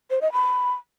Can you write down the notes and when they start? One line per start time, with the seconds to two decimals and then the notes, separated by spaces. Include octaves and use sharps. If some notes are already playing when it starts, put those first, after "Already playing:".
0.10 C5
0.21 D#5
0.32 B5